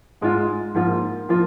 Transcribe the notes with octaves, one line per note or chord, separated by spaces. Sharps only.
G#2 G#3 F4
G#2 F3 A#3 F4
F3 A#3 F4